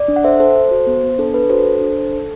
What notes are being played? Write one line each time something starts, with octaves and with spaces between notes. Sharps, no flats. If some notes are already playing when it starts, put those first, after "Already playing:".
Already playing: D5
D4
F#5
A4 C5 E5
A4 C5
A4
F#4
B3
B3
D4 A4
D4 B4
F#4 A4 C5
D4
D4
A4
A4